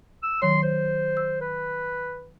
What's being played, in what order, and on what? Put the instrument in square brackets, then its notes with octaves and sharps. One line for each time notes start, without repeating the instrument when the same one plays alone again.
[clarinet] E6
[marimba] D#3 F#3 C#5 [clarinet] C6
[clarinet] C5
[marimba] E6
[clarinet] B4